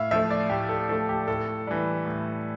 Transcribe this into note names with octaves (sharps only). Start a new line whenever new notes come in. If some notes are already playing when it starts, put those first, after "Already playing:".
Already playing: A2 E5 F5
F3 A3 E5
D5
A2 G4
A4
F3 A3 A4
G4
A2 A4
E3 G3
A2